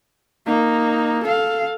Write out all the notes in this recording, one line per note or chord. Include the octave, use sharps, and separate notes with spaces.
A#3 D#4
A4 F5